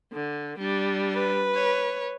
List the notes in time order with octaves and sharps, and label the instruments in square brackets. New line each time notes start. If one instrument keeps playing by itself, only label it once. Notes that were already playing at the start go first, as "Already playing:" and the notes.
[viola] D3
G3 D4
[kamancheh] B4
[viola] C#5